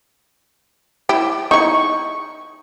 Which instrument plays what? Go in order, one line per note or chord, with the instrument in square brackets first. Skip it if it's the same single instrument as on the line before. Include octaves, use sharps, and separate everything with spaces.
[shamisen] E4 G4
[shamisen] D#4 E4 [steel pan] C#6